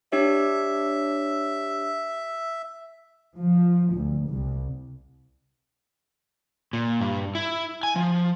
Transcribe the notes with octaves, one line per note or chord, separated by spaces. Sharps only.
D4 G4 C#5 E5
F3
D2
C2
A#2
G2
E4
G#5
F3